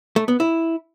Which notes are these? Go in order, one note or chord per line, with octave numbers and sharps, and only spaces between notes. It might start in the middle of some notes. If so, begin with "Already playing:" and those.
A3
B3
E4